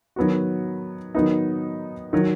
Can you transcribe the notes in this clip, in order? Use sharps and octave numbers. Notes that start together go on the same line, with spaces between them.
D#3 F#3 B3 F#4
D#3 F#3 B3 D#4
D#3 F#3